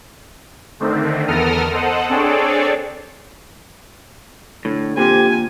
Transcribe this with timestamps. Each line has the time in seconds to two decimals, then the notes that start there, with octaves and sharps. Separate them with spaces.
0.80 D3 D#3 A3 C4
1.28 E2 B3 A4 A#4 D#6 F6
1.72 A4 C5 D#5 F#5
2.09 C4 D4 G#4 A4 C#5 D5
4.65 A2 D3
4.97 A#2 C4 G4 G#5